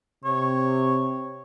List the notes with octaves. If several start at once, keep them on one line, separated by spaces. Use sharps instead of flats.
C3 C#5